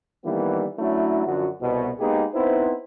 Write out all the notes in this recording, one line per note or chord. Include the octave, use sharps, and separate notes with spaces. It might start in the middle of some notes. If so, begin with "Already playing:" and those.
F2 D#3 E3 G3 A#3 B3
F#3 A3 C#4 D4 E4
F#2 D3 F3 F#4
C2 B2
G#3 A#3 B3 D#4 G4 G#4
B3 C4 D#4 E4 B4 C5